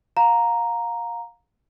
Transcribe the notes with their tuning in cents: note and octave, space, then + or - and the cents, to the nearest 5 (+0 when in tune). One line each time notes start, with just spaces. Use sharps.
F5 +30 A#5 +0